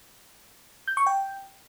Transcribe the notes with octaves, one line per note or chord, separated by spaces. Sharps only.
G6
C#6
G5